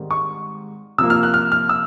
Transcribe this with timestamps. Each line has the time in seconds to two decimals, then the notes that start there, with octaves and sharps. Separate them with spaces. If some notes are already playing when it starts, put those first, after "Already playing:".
Already playing: G#2 D#3 G3 C4
0.11 C#6
0.98 C3 F3 A#3 E6
1.10 F6
1.23 F#6
1.34 F6
1.52 F6
1.69 E6